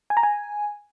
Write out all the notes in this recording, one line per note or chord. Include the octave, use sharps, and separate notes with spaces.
G#5
A#5
G#5